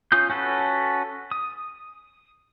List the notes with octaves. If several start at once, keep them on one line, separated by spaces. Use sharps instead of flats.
C#4 F4 D#6 G6
C#4 F#4 A4 B4
D#6